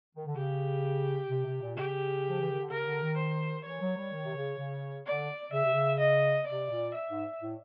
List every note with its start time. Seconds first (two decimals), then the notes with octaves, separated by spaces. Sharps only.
0.16 D#3
0.26 D3
0.36 C#3 G4
1.29 C3
1.46 C3
1.62 A#2
1.76 C#3 G4
2.29 F3
2.40 E3
2.50 D#3
2.60 D3
2.71 C#3 A#4
2.86 D3
3.02 D#3
3.18 C5
3.65 E3 C#5
3.81 F#3
3.97 G3
4.11 D#3
4.25 C3
4.35 C#3
4.58 C#3
5.06 D3 D5
5.52 C#3 E5
5.64 C3
5.73 C#3
5.99 D#5
6.47 C3 D5
6.70 A#2
6.94 E5
7.09 G#2
7.41 A2